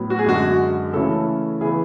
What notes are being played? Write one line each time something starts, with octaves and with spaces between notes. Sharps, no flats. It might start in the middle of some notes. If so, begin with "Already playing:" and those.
Already playing: A2 F#3 B3
F#4
G#4
F#2 D3 G#3 F#4
C#3 E3 A3 C#4 A4
C#3 E3 B3 G#4